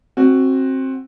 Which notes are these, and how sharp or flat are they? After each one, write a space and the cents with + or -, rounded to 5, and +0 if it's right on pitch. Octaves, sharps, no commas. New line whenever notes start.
C4 +20 F#4 +0